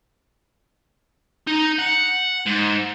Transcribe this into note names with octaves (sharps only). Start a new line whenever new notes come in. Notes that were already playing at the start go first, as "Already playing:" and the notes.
D#4
F#5
G#2